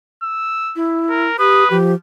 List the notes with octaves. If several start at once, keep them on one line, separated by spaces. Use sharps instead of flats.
E6
E4
A#4
G4 B4 D#6
F3 G4